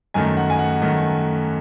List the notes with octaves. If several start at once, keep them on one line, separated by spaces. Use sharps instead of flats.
F#2 D#3 A3 G#5
F#5
G#5
F#5
F#2 D#3 A3